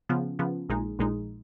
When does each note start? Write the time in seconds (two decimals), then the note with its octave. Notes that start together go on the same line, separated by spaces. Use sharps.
0.09 C#3 F3 B3
0.39 C#3 F3 B3
0.69 A#1 A#2 G#3 D#4
0.99 A#1 A#2 G#3 D#4